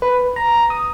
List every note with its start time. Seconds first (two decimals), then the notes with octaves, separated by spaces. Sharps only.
0.02 B4
0.36 A#5
0.70 D#6